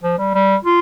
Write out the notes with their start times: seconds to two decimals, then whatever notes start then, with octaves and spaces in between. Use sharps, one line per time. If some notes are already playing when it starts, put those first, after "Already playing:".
0.03 F3
0.19 G3
0.34 G3
0.65 F4